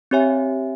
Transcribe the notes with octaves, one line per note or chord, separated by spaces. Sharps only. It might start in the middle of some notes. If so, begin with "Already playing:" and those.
C4 G4 C#5 E5 G#5